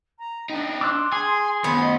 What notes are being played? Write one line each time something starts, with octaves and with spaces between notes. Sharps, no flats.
A#5
D4 D#4 G5
C6 D6 E6 F#6
G#4 G#5
D#3 A3 B3
D#5